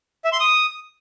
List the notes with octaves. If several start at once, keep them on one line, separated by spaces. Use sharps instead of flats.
E5
C6
D#6